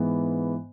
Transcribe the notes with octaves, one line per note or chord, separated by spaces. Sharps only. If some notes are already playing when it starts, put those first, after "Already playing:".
Already playing: G#2 E3 B3